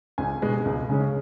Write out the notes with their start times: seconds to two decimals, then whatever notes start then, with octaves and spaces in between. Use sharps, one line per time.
0.18 C#2 G#5
0.42 B2 G#3 B3
0.65 C#2
0.89 C#3 G#3 C#4